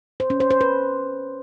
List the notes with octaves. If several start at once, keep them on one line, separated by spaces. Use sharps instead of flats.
C5
C#4
C5
C5
B4